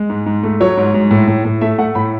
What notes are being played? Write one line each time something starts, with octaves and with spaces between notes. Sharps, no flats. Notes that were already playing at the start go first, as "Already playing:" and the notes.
Already playing: G#3
G#2
G#2
A3
F#3 C#5
G#2
G#2
A2
A2
A2
A3 E5
A3 F#5
A2 B5